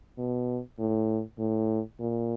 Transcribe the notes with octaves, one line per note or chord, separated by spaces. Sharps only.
B2
A2
A2
A#2